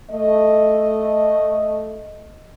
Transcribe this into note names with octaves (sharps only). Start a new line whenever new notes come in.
A3 D#5